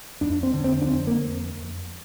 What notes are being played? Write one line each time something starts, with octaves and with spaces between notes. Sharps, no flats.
F2 D4
C4
D3
C4
D4
F2 C4
A#3